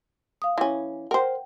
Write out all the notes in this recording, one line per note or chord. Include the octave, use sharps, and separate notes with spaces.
F5 D#6
E3 C#4
A#4 C5 F#5 G5